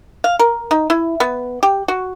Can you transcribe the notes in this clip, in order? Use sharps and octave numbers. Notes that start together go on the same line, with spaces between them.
F5
A#4
D#4
E4
B3
G4
F#4